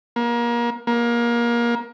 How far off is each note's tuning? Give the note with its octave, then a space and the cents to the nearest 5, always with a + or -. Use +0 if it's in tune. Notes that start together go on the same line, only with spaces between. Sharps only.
A#3 +30
A#3 +25